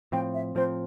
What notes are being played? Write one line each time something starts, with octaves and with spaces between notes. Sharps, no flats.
A2 F3 C4 G5
E5
A2 F3 C4 C5